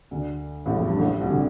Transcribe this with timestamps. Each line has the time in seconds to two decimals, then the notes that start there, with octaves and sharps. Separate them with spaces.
0.11 D2 D3
0.66 A1 A2
0.76 F2
0.88 G2
0.99 A1 A2
1.20 C2 C3
1.27 D3
1.32 C3